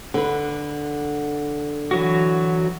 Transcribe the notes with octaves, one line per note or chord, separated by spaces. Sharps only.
D3 B4
E3 F#3 F#4